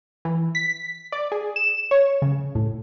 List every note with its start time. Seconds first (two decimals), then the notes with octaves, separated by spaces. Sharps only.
0.25 E3
0.55 B6
1.12 D5
1.32 G#4
1.56 E7
1.91 C#5
2.22 C#3
2.55 A2